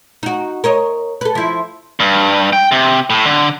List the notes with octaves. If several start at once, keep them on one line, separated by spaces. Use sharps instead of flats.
D#4 F#4
A#4 C#5 D#5
A4 B4
F3 E4
G2
G5
C3
A2
D3